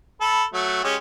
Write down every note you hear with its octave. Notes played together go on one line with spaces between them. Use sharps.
A4 B5
F#3 A3
G#3 C#4 G4